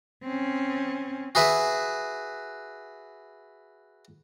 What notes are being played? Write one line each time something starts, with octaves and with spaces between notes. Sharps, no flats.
C4 C#4
F#4 G#4 B4 E5